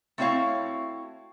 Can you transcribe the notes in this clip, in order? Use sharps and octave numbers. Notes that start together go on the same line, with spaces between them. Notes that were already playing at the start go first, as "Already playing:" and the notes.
A3 C4 E4 F#4 C#5 F5